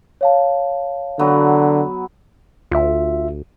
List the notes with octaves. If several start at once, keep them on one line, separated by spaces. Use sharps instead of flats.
C#5 F5 A5
D3 F#3 B3
D2 F4 E5